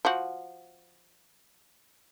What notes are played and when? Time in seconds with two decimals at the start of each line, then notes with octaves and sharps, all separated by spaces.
0.05 F3 F#4